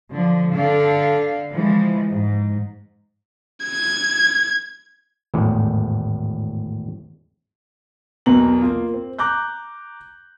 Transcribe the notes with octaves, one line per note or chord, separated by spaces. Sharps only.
D3 F3
D3 D4 A4 F5
E3 F3 G#3
G#2
G#6
G#1 E2 A2
B1 E2 B2 A#4 A#5 F#7
A#3 F4
C4
A#5 D6 F#6 G6